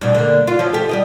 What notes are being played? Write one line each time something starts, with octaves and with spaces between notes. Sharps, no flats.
G2 B2
D3 A#3
F4
F3 F#3 C#4
G4 A4
G3 D5 D#5